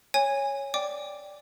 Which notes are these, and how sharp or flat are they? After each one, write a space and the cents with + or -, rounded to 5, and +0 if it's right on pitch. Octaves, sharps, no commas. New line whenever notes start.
C#5 +0 G#5 -20
D5 +0 G5 +0 D6 -5